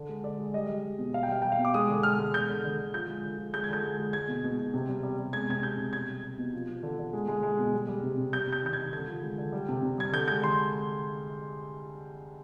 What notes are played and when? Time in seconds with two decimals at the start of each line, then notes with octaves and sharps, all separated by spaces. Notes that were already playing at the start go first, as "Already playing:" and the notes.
Already playing: D3
0.09 G#3
0.24 G#3 D5
0.39 G#3
0.54 G3 D#5
0.68 G3
0.83 G3
0.99 B2
1.13 B2 F5
1.23 G5
1.28 G3 F5
1.42 G3 G5
1.52 F5
1.59 B2
1.65 D6
1.74 G#3 D#6
1.89 D3
2.03 G#3 F6
2.19 G#3
2.34 D3 G6
2.48 D3
2.64 D3
2.79 D3
2.94 F3 G6
3.09 G#3
3.23 D3
3.38 F3
3.54 G#3 G6
3.64 G#6
3.69 D3 G6
3.83 G#3
3.99 G#3
4.13 G#3 G#6
4.28 B2
4.44 B2
4.59 B2
4.74 C3
4.88 G3
5.03 G3
5.19 G3
5.33 G#3 G#6
5.49 C3 G#6
5.63 C3 G6
5.78 C3
5.93 B2 G#6
6.09 G3
6.23 G3
6.39 B2
6.54 F3
6.69 F3
6.83 D3
6.99 D3
7.13 G#3
7.28 G#3
7.43 G#3
7.59 B2
7.73 G3
7.88 G3
8.03 C3
8.18 C3
8.33 G3 G6
8.48 C3 G6
8.63 D#3 G6
8.73 G#6
8.77 D#3
8.93 D3 G#6
9.08 F3
9.22 G#3
9.38 D3
9.52 G3
9.69 C3
9.83 C3
9.98 G3 G#6
10.12 D3 G6
10.28 G#3 G6
10.43 D3 C6